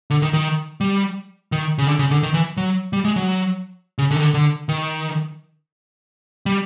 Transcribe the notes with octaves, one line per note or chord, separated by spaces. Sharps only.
D3
D#3
D#3
G3
D#3
C#3
D3
C#3
D3
D#3
E3
F#3
G3
G#3
F#3
C#3
D3
D#3
D3
D3
D#3
G3